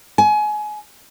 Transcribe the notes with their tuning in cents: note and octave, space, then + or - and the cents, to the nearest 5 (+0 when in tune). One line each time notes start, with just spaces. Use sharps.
G#5 +25